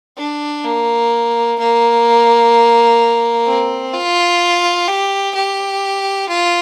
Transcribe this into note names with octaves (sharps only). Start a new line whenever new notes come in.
D4
A#3
A#3
C4
F4
G4
G4
F4